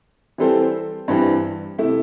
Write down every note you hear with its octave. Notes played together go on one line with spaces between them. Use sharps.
E3 G3 C4 A4 C5
G2 E3 G3 C4
C3 A3 E4